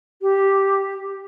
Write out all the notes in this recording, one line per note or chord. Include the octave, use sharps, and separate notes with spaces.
G4